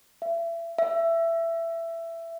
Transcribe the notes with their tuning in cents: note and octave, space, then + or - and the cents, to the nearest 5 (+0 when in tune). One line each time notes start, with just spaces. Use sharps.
E5 +30
E5 +15